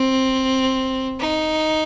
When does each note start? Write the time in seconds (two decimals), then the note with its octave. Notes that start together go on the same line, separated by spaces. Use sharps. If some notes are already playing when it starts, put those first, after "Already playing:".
Already playing: C4
1.20 D#4